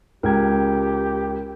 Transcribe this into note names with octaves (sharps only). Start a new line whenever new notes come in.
C#2 G4 A#4 G5 G#6